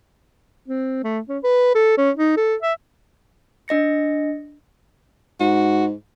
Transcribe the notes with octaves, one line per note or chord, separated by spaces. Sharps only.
C4
A3
C#4
B4
A4
C#4
D#4
A4
E5
D4 D#5 A#6 C#7
G#2 F#4